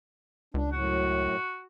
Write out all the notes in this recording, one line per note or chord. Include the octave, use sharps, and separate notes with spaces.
C#2 D4
F#2 A2 F#4